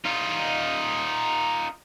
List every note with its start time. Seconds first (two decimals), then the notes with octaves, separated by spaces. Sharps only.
0.05 D#4 F4